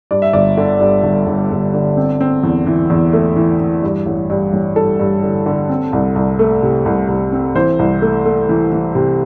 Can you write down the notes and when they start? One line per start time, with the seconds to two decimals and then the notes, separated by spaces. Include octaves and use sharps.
0.11 G2 D5
0.22 E5
0.33 G1 D5
0.57 D3
0.80 G2
1.04 G1
1.27 G1
1.51 G1
1.74 D3
1.97 C4
2.21 C4
2.43 E2
2.67 E3
2.90 E2
3.13 A3
3.36 E3
3.60 E3
3.83 G2
4.06 A1
4.30 G2
4.53 A1
4.76 G2 A4
5.00 G2
5.23 D3
5.46 D3
5.69 C4
5.93 C2
6.16 C2
6.39 A3
6.63 C3
6.86 C2
7.09 C2
7.32 C4
7.55 E3 C5
7.79 C2
8.02 A3
8.25 A3
8.49 E3
8.72 E3
8.95 C3